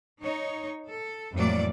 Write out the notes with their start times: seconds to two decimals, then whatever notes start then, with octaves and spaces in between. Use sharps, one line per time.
0.22 D#4 C#5
0.88 A4
1.34 F2 A2 E3 F#3 A#3 D5